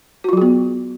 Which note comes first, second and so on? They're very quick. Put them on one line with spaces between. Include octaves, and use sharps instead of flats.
F#4 F4 F#3 G#4 B3